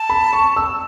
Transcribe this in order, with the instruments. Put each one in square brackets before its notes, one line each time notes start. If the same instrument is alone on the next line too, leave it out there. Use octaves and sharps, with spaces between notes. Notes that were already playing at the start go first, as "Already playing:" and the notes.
Already playing: [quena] A5
[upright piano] B5
C#6
E6